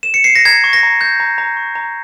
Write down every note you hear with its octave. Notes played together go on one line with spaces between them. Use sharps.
E7
C#7
C7
A#6
A#5 G#6
C#6
A#6
A#5
A#5 G6
A#5
A#5
C#6
A#5